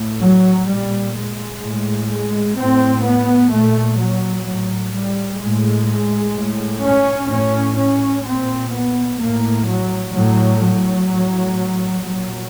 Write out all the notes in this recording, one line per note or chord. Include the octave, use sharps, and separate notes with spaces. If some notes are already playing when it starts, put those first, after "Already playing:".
Already playing: A2
F#3
A#2 G3
G#3
A2
G#3
A2 C4
B3
A#2 A3
F#3
A2 F#3
G3
A2 G#3
A2
C#4
A2 C#4
C#4
A#2 C4
B3
A2 A#3
F#3
A2 F#3
F#3
A2
A#2 F#3